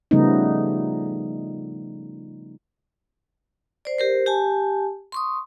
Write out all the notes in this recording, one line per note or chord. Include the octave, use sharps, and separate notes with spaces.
C#3 F3 G3 A3 B3 D#4
C5 D5
G4 A#4 C5
G4 G#5 A5
C6 C#6 D#6